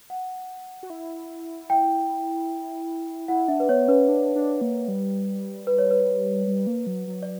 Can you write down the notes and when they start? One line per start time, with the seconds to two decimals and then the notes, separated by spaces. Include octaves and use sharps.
0.10 F#5
0.83 F#4
0.90 E4
1.69 E4 G5
3.28 E4 F#5
3.48 D4 E5
3.60 B4
3.69 B3 C#5
3.88 C#4 B4
4.08 D4
4.35 D4
4.61 A#3
4.88 G3
5.67 B4
5.78 C#5
5.91 B4
6.47 G3
6.67 A#3
6.87 F#3
7.07 F#3
7.23 D5